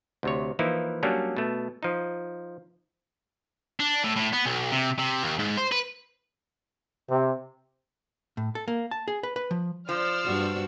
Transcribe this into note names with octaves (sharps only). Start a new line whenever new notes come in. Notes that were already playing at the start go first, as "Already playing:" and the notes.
D2 C3 C#5
E3 F3 A#3 D#4 E4
F#3 G3 A#3 C#4 D4
B2 A3
F3 D#4
D4
A2
A2
B3
B1
C3
C3
D#2
G#2
C5
B4
C3
A2
A4
A#3
A5
G#4
B4
B4
F3
F3 C5 D5 E6 F6
G2 F#4